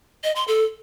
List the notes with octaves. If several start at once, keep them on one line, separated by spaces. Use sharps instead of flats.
D#5
C6
A4